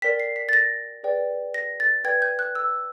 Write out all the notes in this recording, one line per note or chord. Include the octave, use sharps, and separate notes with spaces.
A#4 D5 G5 B6
C7
B6
A6
A#6
G#4 B4 D5 G5
A#6
A6
B4 D5 G5 G#6
G6
F#6
E6